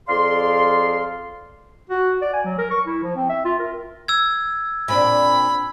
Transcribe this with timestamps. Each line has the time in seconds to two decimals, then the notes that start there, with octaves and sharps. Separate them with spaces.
0.09 F2 G#4 D5 F5 C6
1.90 F#4
2.21 D5
2.33 G#5
2.45 F#3
2.58 A#4
2.71 C#6
2.86 E4
3.03 F3
3.16 C4
3.29 E5
3.45 F4
3.59 A#4
4.08 E6 G#6
4.88 A#2 C4 D4 B5